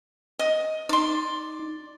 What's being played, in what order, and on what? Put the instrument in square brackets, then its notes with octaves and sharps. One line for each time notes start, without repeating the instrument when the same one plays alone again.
[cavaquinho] D#5
[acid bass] D#4 [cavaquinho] D5 C6